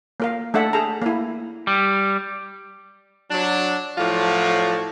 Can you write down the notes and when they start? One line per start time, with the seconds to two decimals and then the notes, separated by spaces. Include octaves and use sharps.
0.20 A#3 A#4 F5
0.54 A3 D4 A4 E5 F#5
0.73 G#4 A5 A#5
1.02 A#3 E4
1.67 G3
3.31 F#3 D4
3.97 A2 F3 F#3 F4 F#4 D5